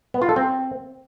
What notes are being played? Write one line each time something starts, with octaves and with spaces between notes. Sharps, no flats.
B3
F4
A4
C4